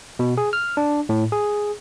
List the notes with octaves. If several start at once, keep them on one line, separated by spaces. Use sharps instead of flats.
B2
G#4
F6
D4
A2
G#4